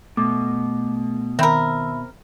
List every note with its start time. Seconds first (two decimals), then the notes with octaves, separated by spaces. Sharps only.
0.17 B2 A3 D6
1.39 D#3 C4 A#4 E5 B5 E6